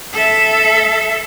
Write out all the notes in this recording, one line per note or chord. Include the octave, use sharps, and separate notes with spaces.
A4 E5